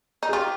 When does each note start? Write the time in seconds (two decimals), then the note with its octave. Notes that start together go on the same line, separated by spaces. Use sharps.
0.23 D#4
0.29 G#4
0.33 F4 G4